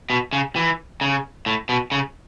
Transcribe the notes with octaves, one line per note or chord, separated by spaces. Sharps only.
B2
C#3
E3
C#3
A2
B2
C#3